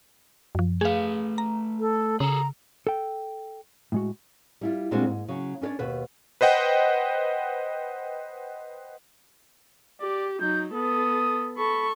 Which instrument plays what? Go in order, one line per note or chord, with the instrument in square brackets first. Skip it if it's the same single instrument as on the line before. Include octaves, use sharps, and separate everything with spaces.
[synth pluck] F#2 F3
[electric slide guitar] A3 B4 [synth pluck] G#4 F5
[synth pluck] A#5
[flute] A4
[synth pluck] C#3 [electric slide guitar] G#4 A4 [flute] A#5
[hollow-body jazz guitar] A4 G5
A2 G#3 F#4
[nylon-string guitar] G3 E4 F4
A#2 G3 G#3 C4 D4 F#4
G#2
C#3 F#3
C#4 D4 A#4 C#5 D5
D#2 B2 B4 C5
[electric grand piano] B4 C5 D#5 F#5 G5
[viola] G4 [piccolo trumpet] D5
[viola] F#3 D#4 [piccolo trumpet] G6
[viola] B3 A4 [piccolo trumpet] D#6
[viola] A4 C#6 [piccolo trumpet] B5